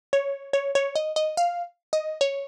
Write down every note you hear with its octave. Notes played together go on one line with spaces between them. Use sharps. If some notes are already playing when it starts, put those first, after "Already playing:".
C#5
C#5
C#5
D#5
D#5
F5
D#5
C#5